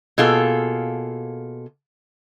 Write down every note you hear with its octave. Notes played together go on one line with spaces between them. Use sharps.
B2 A#3 F4 G#4 A4